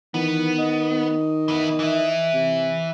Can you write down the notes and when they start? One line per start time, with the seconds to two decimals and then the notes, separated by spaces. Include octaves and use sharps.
0.14 D#3 E3 B3
0.58 D#5
1.48 E3 B3
1.79 E3 E4
2.34 C3